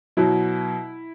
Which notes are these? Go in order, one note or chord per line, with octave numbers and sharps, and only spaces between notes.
B2 F#3 E4